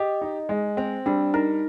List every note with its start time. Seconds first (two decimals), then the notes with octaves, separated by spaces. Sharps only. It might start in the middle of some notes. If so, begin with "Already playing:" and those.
Already playing: G4 D#5
0.21 D#4
0.49 G#3
0.77 C4 C5
1.06 G3 D4
1.34 D#4 A#4